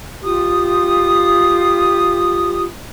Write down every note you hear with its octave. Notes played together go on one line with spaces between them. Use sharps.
F4 G4 D#6